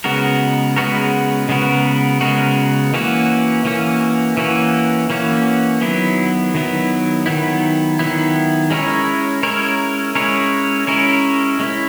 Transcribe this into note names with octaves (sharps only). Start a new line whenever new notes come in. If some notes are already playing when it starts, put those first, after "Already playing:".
C#3 G#3 B3 F#4 A#4
C#3 G#3 B3 F#4 A#4
C#3 G#3 B3 F#4 A#4
C#3 G#3 B3 F#4 A#4
E3 A#3 C#4 F#4
E3 A#3 C#4 F#4
E3 A#3 C#4 F#4
E3 A#3 C#4 F#4
D#3 F#3 B3 E4
D#3 F#3 B3 E4
D#3 F#3 B3 E4
D#3 F#3 B3 E4
G#3 C#4 E4 A#4 C#5
G#3 C#4 E4 A#4 C#5
G#3 C#4 E4 A#4 C#5
G#3 C#4 E4 A#4 C#5
G#3 C#4 E4